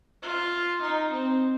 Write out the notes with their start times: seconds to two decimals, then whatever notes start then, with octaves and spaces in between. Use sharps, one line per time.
0.22 F4
0.81 D#4
1.12 C4